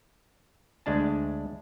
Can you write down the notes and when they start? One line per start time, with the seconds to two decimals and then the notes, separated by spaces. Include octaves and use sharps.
0.86 D2 G#3 D4 A5